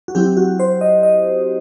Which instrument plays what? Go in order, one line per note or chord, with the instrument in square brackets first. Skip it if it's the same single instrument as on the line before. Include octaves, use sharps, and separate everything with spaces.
[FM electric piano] F#4
F#3 C4 E4 G4
F#4
C5
D#5
D#5